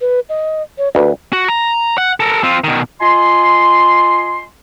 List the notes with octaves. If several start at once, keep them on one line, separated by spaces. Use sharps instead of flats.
B4
D#5
C#5
D2 B4
F#4
A#5
F#5
A4 A#4
C4 F4
B2 D#3
F4 D#5 G#5 C6